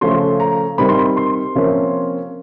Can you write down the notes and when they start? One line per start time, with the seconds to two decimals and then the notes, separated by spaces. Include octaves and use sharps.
0.01 C#3 F3 A3 C#4 C6
0.40 A#5
0.78 C3 D#3 G3 C4 B5
0.89 C6
0.99 B5
1.17 C6
1.55 C3 F3 A#3 C#4